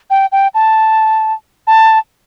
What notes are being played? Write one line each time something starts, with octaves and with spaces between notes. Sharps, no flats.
G5
G5
A5
A5